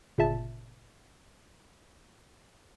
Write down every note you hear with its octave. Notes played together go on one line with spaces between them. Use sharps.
G1 A#2 C#3 E5 A5 A6